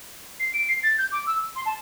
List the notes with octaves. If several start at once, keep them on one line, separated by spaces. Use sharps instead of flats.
C7
D7
C7
A6
G6
D6
E6
C6
A5